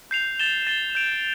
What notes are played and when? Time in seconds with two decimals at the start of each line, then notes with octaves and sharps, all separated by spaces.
0.11 G6 C7 F7
0.39 A6 E7 G7
0.67 A6 E7 G7
0.95 G6 D7 F7